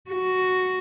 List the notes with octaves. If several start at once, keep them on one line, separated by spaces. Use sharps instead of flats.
F#4